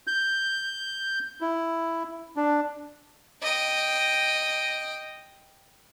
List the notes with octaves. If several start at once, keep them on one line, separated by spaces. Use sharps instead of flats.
G6
E4
D4
D#5 G5